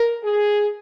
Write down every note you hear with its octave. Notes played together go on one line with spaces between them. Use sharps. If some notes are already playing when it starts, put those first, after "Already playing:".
Already playing: A#4
G#4